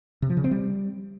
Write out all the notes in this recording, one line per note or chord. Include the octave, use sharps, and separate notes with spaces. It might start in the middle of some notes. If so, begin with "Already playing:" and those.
C3
F3
C#3
C4
G3